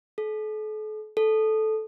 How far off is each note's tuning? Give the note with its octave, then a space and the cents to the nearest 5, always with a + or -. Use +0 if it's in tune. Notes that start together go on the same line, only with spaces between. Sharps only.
A4 -40
A4 -10